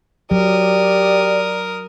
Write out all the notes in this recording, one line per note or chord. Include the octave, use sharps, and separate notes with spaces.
F#3 G4 A#4 D5 D#6